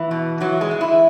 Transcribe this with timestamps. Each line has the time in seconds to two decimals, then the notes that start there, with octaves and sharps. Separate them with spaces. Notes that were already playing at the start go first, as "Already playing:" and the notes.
Already playing: E3
0.11 B2
0.40 E3 F#3
0.61 G#3
0.71 E3
0.81 E4